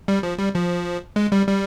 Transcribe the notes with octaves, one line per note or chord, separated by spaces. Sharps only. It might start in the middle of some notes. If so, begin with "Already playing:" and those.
G3
F3
G3
F3
G#3
G3
G3